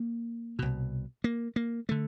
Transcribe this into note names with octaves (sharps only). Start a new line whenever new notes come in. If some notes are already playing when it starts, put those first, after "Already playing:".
Already playing: A#3
C2 B2
A#3
A#3
D3 A3